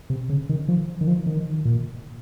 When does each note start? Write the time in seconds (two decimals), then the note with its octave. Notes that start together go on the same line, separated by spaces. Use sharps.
0.10 C3
0.29 C#3
0.49 D#3
0.68 F3
1.01 D#3
1.07 F3
1.26 D#3
1.65 A#2